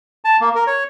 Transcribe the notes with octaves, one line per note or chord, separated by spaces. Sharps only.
A5
A#3
A#4
C#5